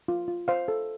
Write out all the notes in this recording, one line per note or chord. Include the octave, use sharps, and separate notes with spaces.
F4
F4
C5 F5
A4